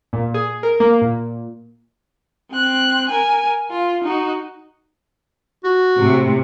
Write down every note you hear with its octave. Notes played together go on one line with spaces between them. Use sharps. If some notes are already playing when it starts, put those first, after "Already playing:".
A#2
G#4
A#4
A#3
A#2
C4 F#6
A#4 G#5
F4
D#4 F#4
F#4
A2 C3